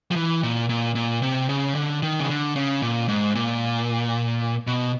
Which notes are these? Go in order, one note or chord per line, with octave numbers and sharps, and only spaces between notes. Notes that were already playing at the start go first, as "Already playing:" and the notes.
F3
E3
A#2
A#2
A#2
C3
C#3
D3
D#3
C#3
D3
C#3
A#2
G#2
A#2
B2